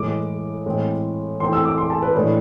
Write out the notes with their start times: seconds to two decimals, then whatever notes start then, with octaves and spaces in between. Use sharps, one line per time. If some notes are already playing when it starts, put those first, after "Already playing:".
Already playing: A2 E3 G#3 D6
0.66 A2 E3 G#3 C4
1.40 E3 A3 C4 C6
1.53 E6
1.65 D6
1.78 C6
1.90 A5
2.02 B4
2.15 A2 E3 G#3 D4 B4